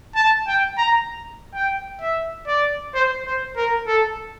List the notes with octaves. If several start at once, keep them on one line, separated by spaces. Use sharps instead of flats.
A5
G5
A#5
G5
E5
D5
C5
C5
A#4
A4